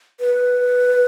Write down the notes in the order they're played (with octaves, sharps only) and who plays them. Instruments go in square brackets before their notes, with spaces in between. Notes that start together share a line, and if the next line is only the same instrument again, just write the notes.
[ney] B4